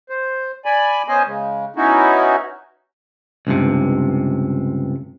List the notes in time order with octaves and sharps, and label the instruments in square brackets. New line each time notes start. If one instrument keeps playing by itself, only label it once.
[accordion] C5
D5 G#5 B5
B3 C#4 C5 D#5 G#5
C#3 G#3
B3 C#4 D#4 E4 F#4
[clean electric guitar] C#2 G2 C3